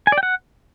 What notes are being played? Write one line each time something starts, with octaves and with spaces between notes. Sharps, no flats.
G#5
D5
G5
F#5